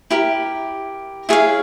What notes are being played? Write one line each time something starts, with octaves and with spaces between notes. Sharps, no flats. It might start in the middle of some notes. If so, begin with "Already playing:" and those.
E4 G4 A#4
E4 G#4 C#5 F5